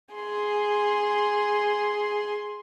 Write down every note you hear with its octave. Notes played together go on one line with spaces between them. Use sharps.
G#4 C6